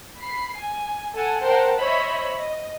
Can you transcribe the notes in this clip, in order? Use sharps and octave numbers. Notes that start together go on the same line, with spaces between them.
B5 C7
G#5
A4 F#5 G#5
A#4 C5 F#5 G5 A5
C5 C#5 D#5 E5 B5
D#5